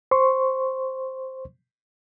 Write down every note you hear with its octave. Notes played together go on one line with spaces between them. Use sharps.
C5 C6 C#6